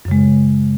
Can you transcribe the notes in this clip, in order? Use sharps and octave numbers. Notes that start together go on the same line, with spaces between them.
F#2 C#3 G#3